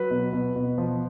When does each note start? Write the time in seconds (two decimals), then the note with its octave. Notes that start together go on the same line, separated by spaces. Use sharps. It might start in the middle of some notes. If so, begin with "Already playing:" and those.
Already playing: F#3 B4
0.11 B2
0.33 B2
0.56 B2
0.78 F3